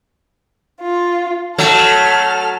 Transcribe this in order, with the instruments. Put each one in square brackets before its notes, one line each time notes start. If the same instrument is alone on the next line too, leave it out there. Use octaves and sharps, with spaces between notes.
[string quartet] F4
[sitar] F#3 A3 [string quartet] A4 F6